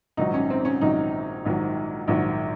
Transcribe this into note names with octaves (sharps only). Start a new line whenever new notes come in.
A#1 G#2 D#3 F#3 D#4
C#4
C4
C#4
A#1 G#2 D#3 F#3 D#4
A#1 G#2 D#3 F#3
A#1 G#2 D#3 F#3